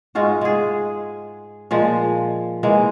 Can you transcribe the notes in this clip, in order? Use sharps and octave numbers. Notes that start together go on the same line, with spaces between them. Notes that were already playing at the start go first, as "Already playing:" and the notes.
G#2 G#3 F4 F#4
G#3 G#4
A#2 F3 G#3
E3 G#3 A#3